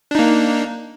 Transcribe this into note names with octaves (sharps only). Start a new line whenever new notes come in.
A#3 D4 D#4